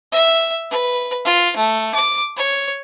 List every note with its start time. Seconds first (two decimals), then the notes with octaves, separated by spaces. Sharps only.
0.12 E5
0.70 B4
1.25 F4
1.57 A3
1.95 D6
2.37 C#5